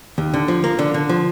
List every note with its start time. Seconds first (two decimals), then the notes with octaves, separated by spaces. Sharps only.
0.18 D#2
0.34 D3
0.48 F3
0.64 A#3
0.79 D3
0.94 D3
1.09 F3